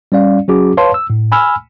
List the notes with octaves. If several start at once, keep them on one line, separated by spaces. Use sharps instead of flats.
G3 C#4 D5 F5
F#3 C#4 F#4 G#4 D6
B4 C#5 F5 A5 C6
E6
A2
G#5 B5 E6 F6